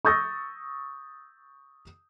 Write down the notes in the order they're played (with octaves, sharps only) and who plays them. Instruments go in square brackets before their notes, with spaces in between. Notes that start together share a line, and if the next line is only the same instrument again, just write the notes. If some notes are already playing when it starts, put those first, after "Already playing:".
[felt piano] C#6 D#6 E6 G6 A6 A#6